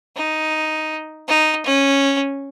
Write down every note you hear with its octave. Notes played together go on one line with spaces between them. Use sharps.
D#4
D#4
C#4